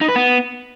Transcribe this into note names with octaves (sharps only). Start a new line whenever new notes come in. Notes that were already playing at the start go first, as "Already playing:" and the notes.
D#4
B4
B3